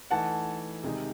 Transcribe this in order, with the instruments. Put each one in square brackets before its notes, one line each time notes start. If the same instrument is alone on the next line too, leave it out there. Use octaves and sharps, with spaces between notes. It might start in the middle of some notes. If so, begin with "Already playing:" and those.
[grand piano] E3 A3 D#4 [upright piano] F#5 A5
[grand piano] C3 D#3 G#3 D#4